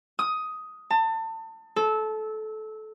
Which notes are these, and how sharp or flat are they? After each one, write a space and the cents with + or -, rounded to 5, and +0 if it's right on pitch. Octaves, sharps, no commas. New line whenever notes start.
D#6 +10
A5 +30
A4 -20